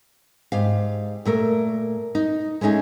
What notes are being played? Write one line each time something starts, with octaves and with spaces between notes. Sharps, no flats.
G#2 G4 F5
A#2 A3 A#4
D#4
G#3 A3 C#4 D#4 G#4